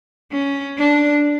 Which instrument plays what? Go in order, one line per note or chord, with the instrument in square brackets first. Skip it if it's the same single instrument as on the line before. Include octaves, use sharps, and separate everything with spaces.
[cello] C#4
D4